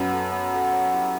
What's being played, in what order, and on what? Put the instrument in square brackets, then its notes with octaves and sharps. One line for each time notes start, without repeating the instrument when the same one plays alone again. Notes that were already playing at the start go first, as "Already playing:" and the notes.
Already playing: [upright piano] F#2 [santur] B3
[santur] F#4 A4 C#5
B3
F#4 A4 C#5
C#4
E4 G4